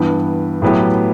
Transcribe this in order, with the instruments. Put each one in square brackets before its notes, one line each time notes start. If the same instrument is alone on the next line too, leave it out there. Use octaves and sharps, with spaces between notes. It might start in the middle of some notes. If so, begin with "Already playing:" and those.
Already playing: [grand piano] G2 E3 B3
A2 F#3 B3 E4 G4